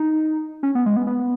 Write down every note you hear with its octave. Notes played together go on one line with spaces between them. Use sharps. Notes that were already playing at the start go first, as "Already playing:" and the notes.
Already playing: D#4
C#4
B3
G#3
B3
B3